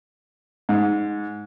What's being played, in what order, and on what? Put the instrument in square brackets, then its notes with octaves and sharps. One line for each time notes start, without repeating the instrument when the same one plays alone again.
[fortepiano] G#2